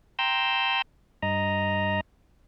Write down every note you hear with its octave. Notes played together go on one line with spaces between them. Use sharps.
G5 A#5 C6 E6 G6
G2 D#5 A#5